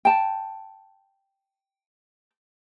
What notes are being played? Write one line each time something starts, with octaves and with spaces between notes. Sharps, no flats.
G5 A5